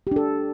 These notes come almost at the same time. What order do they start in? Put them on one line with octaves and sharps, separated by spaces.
G4 D4 A4